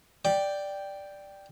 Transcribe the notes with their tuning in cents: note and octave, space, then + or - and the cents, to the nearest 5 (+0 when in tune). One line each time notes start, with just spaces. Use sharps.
D5 +0 G5 +0